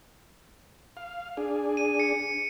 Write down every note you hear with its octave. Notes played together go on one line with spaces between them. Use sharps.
F5
D4 G#4
D#7
C#7